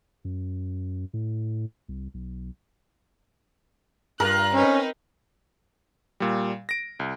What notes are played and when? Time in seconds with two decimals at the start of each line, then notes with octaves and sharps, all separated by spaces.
0.25 F#2
1.13 A2
1.89 C2
2.14 B1
4.20 G2 F4 A#4 F#6
4.54 C4 C#4 D#4 B4
6.20 A#2 G3
6.69 A#6 D7
7.00 C2